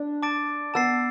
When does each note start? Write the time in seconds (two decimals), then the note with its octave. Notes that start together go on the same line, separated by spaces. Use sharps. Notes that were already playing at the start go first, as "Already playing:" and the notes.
Already playing: D4
0.23 A5 D6 A6 D7
0.74 B3 A5 E6 A6 C7